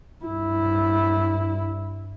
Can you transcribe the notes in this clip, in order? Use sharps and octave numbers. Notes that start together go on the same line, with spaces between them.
G2 E4